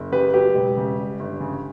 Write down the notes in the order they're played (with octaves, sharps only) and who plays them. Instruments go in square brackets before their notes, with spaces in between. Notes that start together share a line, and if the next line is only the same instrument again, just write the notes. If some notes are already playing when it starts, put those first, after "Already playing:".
Already playing: [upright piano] F#1
[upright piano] C#3 [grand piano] G4 B4
[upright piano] F#3 [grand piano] G4 B4
[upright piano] E1
C#3
G3
G1
C#3